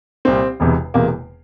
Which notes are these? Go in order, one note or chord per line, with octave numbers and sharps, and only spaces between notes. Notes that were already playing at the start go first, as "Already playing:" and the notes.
C2 A#2 C4
E1 E2 C3
E1 E2 C3 A#3